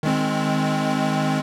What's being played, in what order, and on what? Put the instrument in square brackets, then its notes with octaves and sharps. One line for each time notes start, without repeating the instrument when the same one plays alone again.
[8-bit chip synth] D#3 G#3 C4